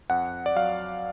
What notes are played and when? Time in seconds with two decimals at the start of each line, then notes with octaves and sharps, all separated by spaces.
0.10 F2 F#5
0.46 D5
0.56 F#3 F5